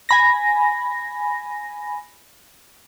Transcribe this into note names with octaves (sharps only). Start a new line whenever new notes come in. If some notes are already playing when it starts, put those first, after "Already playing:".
G#5 B5 A#6